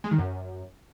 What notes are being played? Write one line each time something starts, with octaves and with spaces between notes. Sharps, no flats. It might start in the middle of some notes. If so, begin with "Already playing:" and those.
G#3
D#3
F#2